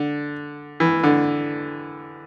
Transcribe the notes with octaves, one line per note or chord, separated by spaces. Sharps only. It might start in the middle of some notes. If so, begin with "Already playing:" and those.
Already playing: D3
E3
D3